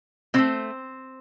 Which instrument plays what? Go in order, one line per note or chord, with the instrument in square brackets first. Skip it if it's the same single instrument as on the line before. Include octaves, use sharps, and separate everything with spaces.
[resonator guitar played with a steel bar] B2 A3 C4 C5